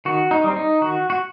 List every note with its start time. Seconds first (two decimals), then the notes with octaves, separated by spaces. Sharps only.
0.05 D#3 F#4
0.31 D#4
0.44 G3 C4
0.56 D#4
0.81 D#3 F#4
1.10 F#4